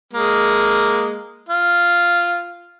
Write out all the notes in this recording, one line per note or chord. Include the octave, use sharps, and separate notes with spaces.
G#3 A#3
F4